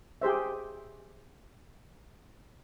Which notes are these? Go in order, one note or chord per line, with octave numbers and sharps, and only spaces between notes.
G4 G#4 C5 E5